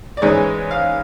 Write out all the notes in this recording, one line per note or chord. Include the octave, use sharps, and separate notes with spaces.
D5
G#2 E3 G#3 C#5
F5